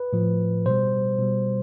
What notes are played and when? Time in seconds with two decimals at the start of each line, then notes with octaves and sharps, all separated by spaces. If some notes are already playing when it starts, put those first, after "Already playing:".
Already playing: B4
0.13 A2 F3
0.66 B2 G3 C5
1.18 B2 G3